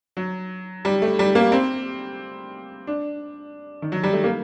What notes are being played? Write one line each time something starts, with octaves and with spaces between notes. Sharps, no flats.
F#3
G3
A3
G3
A#3
C4
D4
D#3
F#3
G3
A3
A#3